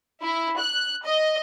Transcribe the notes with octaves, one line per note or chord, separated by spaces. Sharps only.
E4
F#6
D#5